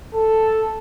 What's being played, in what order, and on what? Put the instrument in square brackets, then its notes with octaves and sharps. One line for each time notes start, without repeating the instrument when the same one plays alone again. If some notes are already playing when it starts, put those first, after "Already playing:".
[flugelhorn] A4